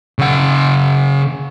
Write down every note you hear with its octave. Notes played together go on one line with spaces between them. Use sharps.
C#3 F#5